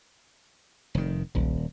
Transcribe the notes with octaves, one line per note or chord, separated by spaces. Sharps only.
F1 D#3
D#1 B1